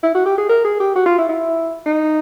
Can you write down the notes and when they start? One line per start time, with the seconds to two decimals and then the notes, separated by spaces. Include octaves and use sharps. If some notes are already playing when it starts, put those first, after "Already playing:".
0.03 E4
0.15 F#4
0.26 G4
0.38 G#4
0.50 A#4
0.65 G#4
0.80 G4
0.96 F#4
1.06 F4
1.19 E4
1.29 E4
1.86 D#4